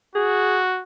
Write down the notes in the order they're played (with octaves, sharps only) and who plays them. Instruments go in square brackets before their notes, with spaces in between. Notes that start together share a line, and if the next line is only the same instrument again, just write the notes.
[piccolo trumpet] F#4 [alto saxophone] G#4